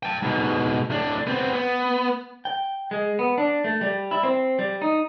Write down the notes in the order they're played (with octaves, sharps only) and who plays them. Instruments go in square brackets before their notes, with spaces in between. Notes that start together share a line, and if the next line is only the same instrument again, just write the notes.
[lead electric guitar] G5 A5
G#2 B2
A2 D4
B3 C4
B3
[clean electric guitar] G5
G#3
B3
D4
A3
G3
E4
C4
G3
D#4